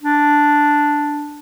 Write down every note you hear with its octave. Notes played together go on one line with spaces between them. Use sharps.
D4